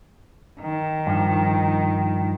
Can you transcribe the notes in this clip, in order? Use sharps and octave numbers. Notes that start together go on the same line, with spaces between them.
D#3
G2 F3